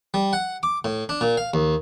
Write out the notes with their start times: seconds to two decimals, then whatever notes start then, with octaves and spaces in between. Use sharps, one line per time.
0.14 G3
0.33 F#5
0.63 D6
0.85 A2
1.09 D4
1.21 A#2
1.37 F5
1.54 D#2